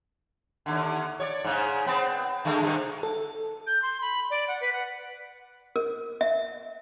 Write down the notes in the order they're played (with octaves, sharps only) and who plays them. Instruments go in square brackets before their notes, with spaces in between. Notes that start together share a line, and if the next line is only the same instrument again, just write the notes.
[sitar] D#2 D3
C#5 D5
G#2 C#3
B3 C4
D3 G#3 A3
G2 C3 D#3
[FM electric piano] A4
[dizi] G6
C6
B5
D5
F#5
B4
F#5
[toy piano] A#4
E5